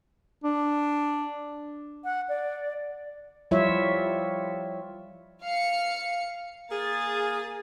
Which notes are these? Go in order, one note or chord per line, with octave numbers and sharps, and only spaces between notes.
D4
F#5
D5
F3 G3 E4 F4 C#5 E5
F5 C#7
A#3 G#4 A6